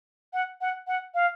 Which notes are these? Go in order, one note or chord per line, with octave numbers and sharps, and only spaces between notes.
F#5
F#5
F#5
F5